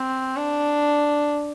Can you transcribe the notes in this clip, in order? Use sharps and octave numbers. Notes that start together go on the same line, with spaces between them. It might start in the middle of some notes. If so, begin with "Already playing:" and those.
Already playing: C4
D4